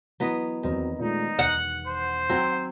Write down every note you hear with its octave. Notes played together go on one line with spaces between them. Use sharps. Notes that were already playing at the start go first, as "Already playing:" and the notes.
E3 F#3 B3 D#5
E2 D#3 F#3 C4
A#2 G#3 A3 D#4
E1 F#5
C5
F#3 C4 G5 C6 E6